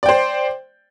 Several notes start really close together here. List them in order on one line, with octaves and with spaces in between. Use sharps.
D5 G5 C5